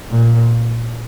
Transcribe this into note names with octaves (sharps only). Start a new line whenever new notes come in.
A#2